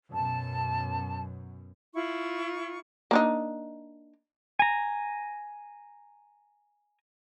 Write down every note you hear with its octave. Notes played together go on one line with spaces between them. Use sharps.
F#2 B2 A5
E4 F4 C#6
A#3 D4 D#4
G#5 A#5